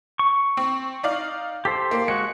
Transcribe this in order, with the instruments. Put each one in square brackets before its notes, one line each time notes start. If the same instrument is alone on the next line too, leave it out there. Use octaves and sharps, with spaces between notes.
[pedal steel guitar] C#6
[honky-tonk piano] C4
D#4 D5 F5
[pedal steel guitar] G4 A4 C5 [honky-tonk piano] B6
[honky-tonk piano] A#3
[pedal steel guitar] G#3 F#4 [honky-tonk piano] C#7